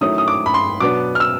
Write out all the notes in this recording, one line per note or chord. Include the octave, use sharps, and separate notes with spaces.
D#3 F#3 A3 C#4 E4 D#6
D#6
D6
B5
C6
B2 F#3 B3 D4 D6
F6
E6